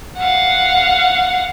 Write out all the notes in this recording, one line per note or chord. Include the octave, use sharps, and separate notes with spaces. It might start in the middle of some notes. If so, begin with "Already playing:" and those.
F5 F#5